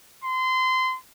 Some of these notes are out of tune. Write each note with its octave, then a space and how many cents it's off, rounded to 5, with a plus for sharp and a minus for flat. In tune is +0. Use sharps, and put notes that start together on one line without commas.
C6 -25